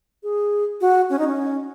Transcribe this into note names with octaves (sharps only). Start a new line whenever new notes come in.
G#4
F#4
C#4
D#4
C#4